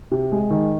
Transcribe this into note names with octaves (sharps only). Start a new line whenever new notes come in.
C3
G#3
D#3